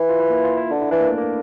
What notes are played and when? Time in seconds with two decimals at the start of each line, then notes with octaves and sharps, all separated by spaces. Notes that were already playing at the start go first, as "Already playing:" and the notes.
Already playing: E3
0.09 F4
0.20 E4
0.30 A#3
0.44 F4
0.57 E4
0.70 D3 D4
0.81 E4
0.91 E3 D4
1.01 A#3
1.10 A3
1.18 A#3